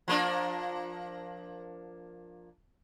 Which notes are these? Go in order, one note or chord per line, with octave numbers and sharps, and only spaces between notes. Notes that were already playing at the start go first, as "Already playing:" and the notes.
F3 A#3 D4